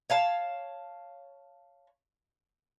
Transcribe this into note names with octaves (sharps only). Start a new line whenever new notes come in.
C#5 F5 A5